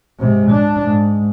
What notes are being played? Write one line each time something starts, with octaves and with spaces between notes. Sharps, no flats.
G#2 C3
D4
G#2